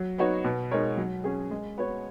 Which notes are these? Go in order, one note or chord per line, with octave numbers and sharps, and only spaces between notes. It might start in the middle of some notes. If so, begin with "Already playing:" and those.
Already playing: F#3
B3 D#4 F#4 C#5
B2
G#3 D#4 A#4 C#5
F#3
C#4 G#4
G#3
B3 F#4 C#5